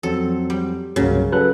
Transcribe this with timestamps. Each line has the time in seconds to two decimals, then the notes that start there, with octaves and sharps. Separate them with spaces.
0.03 F2 F#3 C4 A4
0.50 G3
0.96 C2 G2 C#3 F#3 A#3
1.32 F#3 C#4 A4 B4 F#6